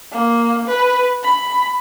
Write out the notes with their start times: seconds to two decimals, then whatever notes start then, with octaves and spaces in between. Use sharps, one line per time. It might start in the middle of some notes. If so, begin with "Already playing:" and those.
0.12 A#3
0.67 B4
1.23 B5